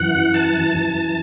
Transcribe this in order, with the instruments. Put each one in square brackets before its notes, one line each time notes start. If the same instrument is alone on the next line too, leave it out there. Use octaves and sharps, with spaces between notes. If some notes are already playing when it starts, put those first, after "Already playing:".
Already playing: [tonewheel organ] F#2 E3 F#5
A5
F#2 E3